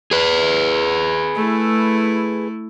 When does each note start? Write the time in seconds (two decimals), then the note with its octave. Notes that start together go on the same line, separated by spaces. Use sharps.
0.11 G#4 B4
1.35 A3 E4